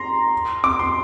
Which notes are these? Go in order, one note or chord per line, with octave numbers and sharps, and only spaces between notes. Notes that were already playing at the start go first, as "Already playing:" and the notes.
Already playing: A#5 C6
D6
C6